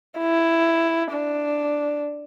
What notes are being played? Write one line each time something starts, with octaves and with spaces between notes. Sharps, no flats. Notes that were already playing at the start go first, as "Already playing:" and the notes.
E4
D4